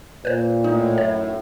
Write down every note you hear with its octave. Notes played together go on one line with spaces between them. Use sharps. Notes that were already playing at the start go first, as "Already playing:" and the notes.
A#2 B4 C5
A2 D#4
F#2 C#5